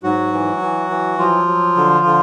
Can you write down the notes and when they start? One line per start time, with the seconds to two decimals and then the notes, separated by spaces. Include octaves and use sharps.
0.03 G#2 F#3 F#4
0.33 E3
0.62 E3
0.90 E3
1.19 F3 F#3 F4
1.47 F#3
1.77 D3
2.06 D3